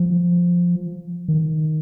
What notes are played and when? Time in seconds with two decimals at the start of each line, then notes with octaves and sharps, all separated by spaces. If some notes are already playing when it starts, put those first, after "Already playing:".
Already playing: F3
1.28 D#3